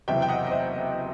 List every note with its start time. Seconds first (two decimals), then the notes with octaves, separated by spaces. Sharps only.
0.08 F#1 E2 C3 F#3 E5 G5
0.22 G5
0.29 D#5 F#5
0.47 D#5
0.51 C5 E5